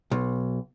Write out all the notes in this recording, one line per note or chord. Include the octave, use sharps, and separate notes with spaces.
B1